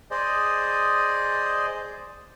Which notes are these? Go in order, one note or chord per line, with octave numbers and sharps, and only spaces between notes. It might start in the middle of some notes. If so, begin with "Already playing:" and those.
G#4 C5 D5 D#5